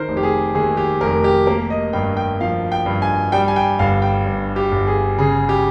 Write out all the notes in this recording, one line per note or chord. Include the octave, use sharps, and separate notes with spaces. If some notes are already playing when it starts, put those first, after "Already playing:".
Already playing: D#3 A#4 C5
F1
G4
G#4
D#2 G#4
G4
F1 A#4
G4
A#3 A#4
D#5
G2 G5
G5
F3 F5
G5
G2
G#5
G3 G5
G#5
G5
G1 F5
G5
G2
G4
G1
G#4
C#3 G#4
G4